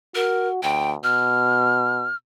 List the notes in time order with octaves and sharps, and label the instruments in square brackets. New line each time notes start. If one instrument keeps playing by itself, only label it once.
[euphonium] F#4 [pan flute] A#4
[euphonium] D2 [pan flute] G5
[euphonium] B2 [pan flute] F6